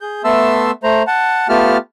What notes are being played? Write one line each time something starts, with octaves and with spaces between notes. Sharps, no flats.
G#4 G6
A3 B3 E5 A5 C6 E6
A3 C5 A#5
F#5 A5
A3 B3 F4 G4 A5 F6